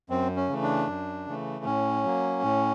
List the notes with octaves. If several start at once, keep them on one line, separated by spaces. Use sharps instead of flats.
F#2 C4
C#4
C#3 E3 A3
D4
F#2
C#3 E3 A3
A2 C#4
F#3 A#3
A2